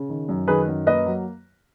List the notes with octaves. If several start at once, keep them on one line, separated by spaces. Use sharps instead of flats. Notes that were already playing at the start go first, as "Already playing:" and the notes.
Already playing: C#3
D#3
F#2
D#3 G#4 B4
F#2
A#3 B4 D#5
F#3